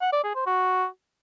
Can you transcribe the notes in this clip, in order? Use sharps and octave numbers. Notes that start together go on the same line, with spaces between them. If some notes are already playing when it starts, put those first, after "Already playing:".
F#5
D5
G#4
C5
F#4